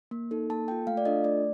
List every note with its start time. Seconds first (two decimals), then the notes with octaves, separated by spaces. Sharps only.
0.11 A#3
0.31 D#4 A4
0.50 A#3 A5
0.68 A4 G5
0.71 F4
0.87 A3 F5
0.97 D5
1.05 D4 F4 A4 D#5
1.24 A3 D5